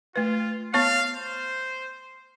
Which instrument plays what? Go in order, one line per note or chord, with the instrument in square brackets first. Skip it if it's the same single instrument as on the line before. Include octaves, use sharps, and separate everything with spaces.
[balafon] A3 B4 [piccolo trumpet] F4
[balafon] B3 C#5 C#6 [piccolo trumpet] F5
[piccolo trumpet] C5